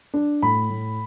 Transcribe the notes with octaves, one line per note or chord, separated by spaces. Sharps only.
D4
A2 B5
A2